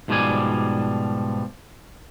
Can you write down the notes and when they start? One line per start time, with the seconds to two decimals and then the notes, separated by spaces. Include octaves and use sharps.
0.08 G#2 B2 F3 G3 D5 G#5